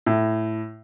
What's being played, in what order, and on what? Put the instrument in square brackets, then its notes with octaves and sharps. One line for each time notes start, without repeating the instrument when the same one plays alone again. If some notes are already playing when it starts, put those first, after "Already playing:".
[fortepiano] A2